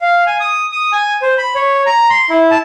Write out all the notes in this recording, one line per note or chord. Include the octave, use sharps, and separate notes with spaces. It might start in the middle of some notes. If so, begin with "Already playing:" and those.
F5
G#5
D#6
D#6
G#5
C5
B5
C#5
A#5
C6
E4
A5